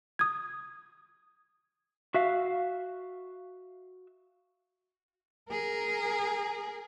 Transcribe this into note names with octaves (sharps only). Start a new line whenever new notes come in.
D#6 G#6
F#4 E5 F5
G#4 A#4